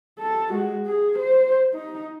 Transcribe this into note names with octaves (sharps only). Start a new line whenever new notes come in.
A4
G#3 F#4
G#4
C5
D#4